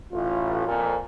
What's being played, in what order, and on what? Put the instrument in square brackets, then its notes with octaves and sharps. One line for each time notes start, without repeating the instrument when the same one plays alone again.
[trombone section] A1 [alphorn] F4
[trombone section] F2 A#2